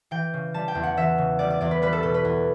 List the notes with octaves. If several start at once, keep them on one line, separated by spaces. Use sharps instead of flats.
E3 G5
C#3
G3 A5
G5
E2
F#5
E3 E5
C#3
G3 D5
D5
E2 D5
B4
G3 B4
A4
B2 A4
B4
E2